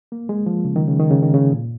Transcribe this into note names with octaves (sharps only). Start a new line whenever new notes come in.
A#3
G#3
F3
C#3
D#3
C#3
D#3
C#3
D#3
C#3
A#2